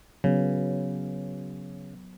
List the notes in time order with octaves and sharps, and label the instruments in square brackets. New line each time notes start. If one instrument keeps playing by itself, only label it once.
[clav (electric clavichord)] C#3 [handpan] F#3 B3